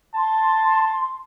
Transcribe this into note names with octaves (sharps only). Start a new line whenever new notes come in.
A5 C6